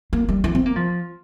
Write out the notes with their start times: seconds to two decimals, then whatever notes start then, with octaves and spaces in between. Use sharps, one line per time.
0.13 A#3
0.29 G3
0.44 E3
0.55 C4
0.66 A#3
0.76 F3